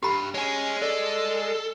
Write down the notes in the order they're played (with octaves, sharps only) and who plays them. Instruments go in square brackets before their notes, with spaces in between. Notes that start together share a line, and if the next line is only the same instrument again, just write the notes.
[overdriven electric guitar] G2 [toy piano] G4 B5
[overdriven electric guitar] G#3 [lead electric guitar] C#5 G#5
[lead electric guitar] A4 [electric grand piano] D5